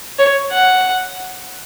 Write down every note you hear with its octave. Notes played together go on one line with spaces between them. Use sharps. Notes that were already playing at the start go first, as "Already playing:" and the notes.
C#5
F#5